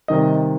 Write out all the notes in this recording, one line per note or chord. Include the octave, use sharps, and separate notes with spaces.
C3 D#3 G3 D#5